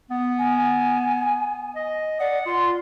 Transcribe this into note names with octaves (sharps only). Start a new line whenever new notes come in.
B3
G#5
D#5
D5 F#5
F4 C6